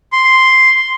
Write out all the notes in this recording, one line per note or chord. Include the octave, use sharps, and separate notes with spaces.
C6